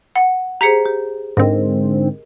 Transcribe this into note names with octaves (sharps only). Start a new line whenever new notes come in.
F#5
G4 G#4 C5 A#5 B6 C#7
G4
G#2 D3 C4 A#4 D#5